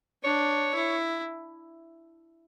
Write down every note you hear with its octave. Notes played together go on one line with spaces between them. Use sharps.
D4 C#5
E4